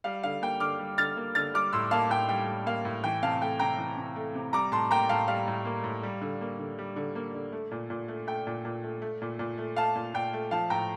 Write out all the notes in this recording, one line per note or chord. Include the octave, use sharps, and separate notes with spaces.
G3 F5
D3 F5
A#3 G5
D3 D6 F6
G3
D3 F6 A6
A#3
D3 F6 A6
G3 D6 F6
A2 C6 E6
A#3 F5 A5
A2 G5
G3 G5
A2
A#3 F5
A2
E3 G5
C3 F5 A5
A3 G5
C3 G5 A#5
E3
C3
A3
C3
G3 A#5 D6
A2 A5 C6
A#3 G5 A#5
A2 F5 A5
G3 F5
A2
A#3
A2
G3
D3
A#3
D3
G3
D3
A#3
D3
A3
A#2
A#2
A3
A3 G5
A#2
A#2
A3
A3
A#2
A#2
A3
A3 F5 A5
A#2
A#2 G5
A3
F3 F5 A5
A2 G5 A#5